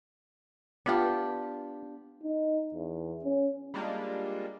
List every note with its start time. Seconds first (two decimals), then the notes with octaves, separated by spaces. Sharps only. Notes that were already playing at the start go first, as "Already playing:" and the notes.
0.86 B3 D4 F4 G4
2.23 D#4
2.74 E2
3.24 C#4
3.74 G3 G#3 A#3 D4 F4